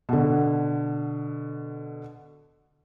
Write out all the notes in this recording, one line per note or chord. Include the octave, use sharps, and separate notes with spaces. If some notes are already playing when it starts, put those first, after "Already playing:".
B2 D3